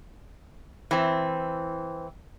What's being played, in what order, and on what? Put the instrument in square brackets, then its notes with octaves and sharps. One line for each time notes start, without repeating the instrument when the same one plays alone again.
[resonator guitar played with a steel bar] E3 C4